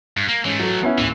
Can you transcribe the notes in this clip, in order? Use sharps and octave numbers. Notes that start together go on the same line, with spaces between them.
G2
A#3
G#2 E3 A3 C#4
F#3 A4
B3 C#4 E4
A1 D#2 E3